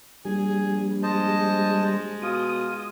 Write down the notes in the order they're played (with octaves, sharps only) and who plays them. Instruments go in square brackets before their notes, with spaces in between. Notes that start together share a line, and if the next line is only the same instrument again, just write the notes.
[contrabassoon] A#1 [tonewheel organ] G3 [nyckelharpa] G#4 [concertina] G#5
[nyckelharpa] G#3 [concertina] C5 D#5 A5
[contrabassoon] B2 [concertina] F4 [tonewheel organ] D#6